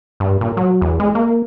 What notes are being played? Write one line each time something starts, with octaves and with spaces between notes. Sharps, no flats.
G2
A#2
F#3
E2
G#3
A#3